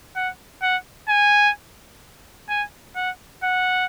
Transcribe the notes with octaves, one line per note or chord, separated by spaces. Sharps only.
F#5
F#5
G#5
G#5
F#5
F#5